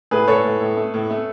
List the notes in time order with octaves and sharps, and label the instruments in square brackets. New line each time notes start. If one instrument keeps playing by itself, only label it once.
[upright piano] A2 [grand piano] G#4 B4
[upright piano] A2 [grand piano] A4 C#5
[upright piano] A2
A2
A3
A2
A3